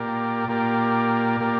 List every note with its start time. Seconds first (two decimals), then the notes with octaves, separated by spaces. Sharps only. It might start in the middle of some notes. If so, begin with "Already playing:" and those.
Already playing: A#2 A#3 G4 A#4 D5
0.48 A#2 A#3 G4 A#4 D5
1.40 A#2 A#3 G4 A#4 D5